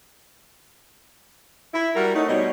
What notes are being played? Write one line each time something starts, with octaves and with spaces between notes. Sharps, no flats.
E4
G3 F#4 A#4
A3 C#4 D#4
B2 G3 C5 C#5 D#5